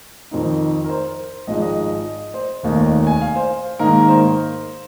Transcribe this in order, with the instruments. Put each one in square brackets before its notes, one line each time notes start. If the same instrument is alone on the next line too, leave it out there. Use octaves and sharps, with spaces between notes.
[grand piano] F2 D#3 C4 D#4
A#4
C5
G#1 G#2 F3 G#3 D#4 D#5
D#5
C5
F1 D#2 D#3 A#3 D#4
G#5
F5
C5
G#2 D#3 A#3 D#4 A#4
C5